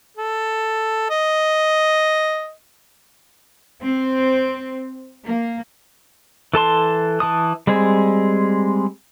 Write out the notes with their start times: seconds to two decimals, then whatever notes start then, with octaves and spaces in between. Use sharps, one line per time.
0.17 A4
1.10 D#5
3.83 C4
5.26 A#3
6.54 E3 A4 A5 C6
7.20 E3 A5 D#6
7.67 G3 G#3 C4 G#4